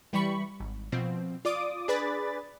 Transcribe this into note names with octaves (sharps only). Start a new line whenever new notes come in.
E3 G3 B5 C#6
G#1
B2 F3 C4
F4 D5 D6 D#6
D4 G#4 B4 D5 B5 A6